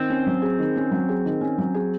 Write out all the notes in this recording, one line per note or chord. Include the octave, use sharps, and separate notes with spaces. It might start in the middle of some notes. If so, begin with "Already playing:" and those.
Already playing: D#3 C4
C#4
F#3
G#4
D#3
C#4
F#3
G#4
D#3
C#4
F#3
G#4